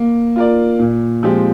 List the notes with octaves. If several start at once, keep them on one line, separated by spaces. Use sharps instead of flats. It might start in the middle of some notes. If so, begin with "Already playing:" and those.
Already playing: A#3
F4 A#4 D5
A#2
F3 G#3 C4 G4